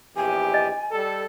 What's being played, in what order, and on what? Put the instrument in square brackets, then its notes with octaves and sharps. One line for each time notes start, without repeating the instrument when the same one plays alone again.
[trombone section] A#1 E2 G4 [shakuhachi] G#5
[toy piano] D#5
[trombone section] G3 A4